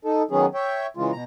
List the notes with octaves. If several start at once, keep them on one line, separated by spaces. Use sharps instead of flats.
D#4 A4
D#3 F#3 B3 C#4 G#4
C#5 E5 G5
C#3 E3 G#3 F4
B2 A#5